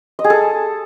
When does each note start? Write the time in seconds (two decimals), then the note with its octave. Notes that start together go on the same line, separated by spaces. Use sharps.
0.19 D#5
0.24 G#4
0.30 A4